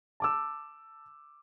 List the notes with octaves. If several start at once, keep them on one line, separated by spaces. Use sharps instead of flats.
A5 D6 E6